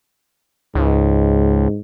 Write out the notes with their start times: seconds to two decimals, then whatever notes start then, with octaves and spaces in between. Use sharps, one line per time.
0.75 C#2 G#2